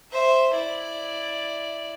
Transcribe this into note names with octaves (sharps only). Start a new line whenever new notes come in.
C5 E5
E4 D5